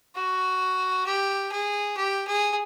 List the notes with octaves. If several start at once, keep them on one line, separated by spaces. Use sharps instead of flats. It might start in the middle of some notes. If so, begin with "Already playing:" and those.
F#4
G4
G#4
G4
G#4